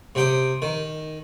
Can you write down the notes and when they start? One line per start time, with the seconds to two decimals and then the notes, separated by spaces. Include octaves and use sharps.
0.15 C3 G5 D#6
0.62 D#3